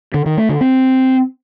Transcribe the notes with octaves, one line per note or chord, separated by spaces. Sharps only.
D3
D#3
A3
D3
C4